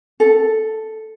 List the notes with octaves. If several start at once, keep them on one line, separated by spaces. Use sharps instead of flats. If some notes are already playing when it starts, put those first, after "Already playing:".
A4